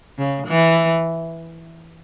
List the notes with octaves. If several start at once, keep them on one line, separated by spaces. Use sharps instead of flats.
C#3
E3